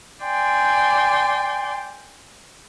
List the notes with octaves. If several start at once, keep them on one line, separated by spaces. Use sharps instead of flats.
D5 G5 G#5 C6